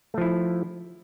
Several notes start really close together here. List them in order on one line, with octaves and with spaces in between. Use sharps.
A3 F3 E4